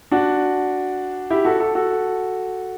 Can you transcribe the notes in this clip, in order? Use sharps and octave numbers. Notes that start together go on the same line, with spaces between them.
D4 F#4
E4 G4
F#4 A4
F#4 A4
F#4 A4